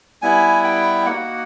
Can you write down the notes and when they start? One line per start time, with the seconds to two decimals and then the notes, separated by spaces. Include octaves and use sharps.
0.22 G3 B3 E4 G#5
0.64 G5
1.06 A#3 D#4 F#4 F#5